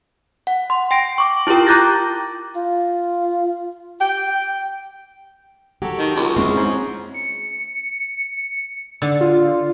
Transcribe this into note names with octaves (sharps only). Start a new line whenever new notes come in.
F#5
C6
G5 A#6 D7
C#6 D6
E4 F4 G4 A#4 G5
A#5 D6 F#6 G6 A6 A#6
F4
G5
F#3 G4 A4
D#3
C#2
G#3 C4 C#4 E4
G#2
C#7
D3
F4